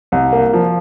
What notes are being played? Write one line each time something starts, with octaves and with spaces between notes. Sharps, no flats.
C2
A#3
F3